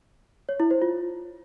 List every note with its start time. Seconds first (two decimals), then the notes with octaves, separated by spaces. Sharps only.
0.49 C#5
0.60 E4
0.71 C5
0.82 F4